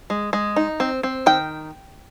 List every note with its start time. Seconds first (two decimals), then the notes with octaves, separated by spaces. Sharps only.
0.10 G#3
0.33 G#3
0.56 D#4
0.80 C4
1.03 C4
1.26 D#3 G5